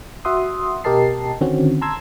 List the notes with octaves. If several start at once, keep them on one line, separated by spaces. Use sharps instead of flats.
F#4 E5 F#5 C6 D#6
B2 G4 A#4 D#5 A5 C7
D3 D#3 C4 C#4 F#4
A5 A#5 C6 E6 G#6